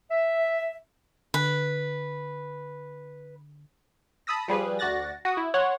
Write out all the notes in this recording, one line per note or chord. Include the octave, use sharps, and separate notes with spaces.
E5
D3 B4
A5 B5 D#6 E6 A#6
F3 G3 G#4 B4
D2 F#4 D5 F#6 A6 A#6
F#4 D#6
E4
C#5 F#5 C6